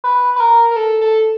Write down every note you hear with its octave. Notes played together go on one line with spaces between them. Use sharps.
B4
B4
A#4
A#4
A4
A4